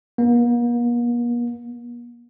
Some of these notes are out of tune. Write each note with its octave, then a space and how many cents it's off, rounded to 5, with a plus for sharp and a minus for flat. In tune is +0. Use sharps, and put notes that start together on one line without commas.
A#3 +45